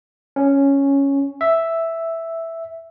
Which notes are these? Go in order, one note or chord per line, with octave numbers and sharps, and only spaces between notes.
C#4
E5